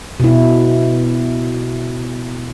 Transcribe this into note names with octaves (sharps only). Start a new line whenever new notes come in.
B2 E4